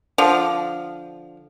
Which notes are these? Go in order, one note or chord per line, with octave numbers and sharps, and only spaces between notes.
D3 F3